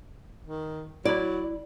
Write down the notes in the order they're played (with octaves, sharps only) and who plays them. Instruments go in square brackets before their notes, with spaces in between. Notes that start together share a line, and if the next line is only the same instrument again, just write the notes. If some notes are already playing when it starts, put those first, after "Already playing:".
[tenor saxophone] D#3
[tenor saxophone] F#3 [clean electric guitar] E4 B5 [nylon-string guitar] D5